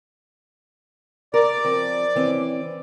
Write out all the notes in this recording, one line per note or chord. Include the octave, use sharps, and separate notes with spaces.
A#4 D5
F3 C4
E3 C4 C#4